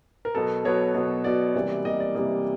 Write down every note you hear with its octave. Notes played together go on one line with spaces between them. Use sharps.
A#4
B2 F#3 B3 A4
B2 F#3 B3 C#5
B2 F#3 B3
B2 F#3 B3 D5
C3 E3 G3 A#3
C3 E3 G3 A#3 D#5
D5
C3 E3 G3 A#3 D#5